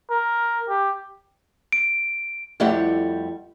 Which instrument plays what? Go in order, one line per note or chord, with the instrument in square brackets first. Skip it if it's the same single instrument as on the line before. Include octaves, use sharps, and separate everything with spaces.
[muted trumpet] A#4
G4
[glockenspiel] D7
[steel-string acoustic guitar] F2 G3 A3 E4 G4 F#5